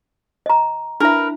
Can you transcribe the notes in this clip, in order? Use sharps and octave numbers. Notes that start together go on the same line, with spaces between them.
D#5 A#5
D4 E4 A#4 B4 E5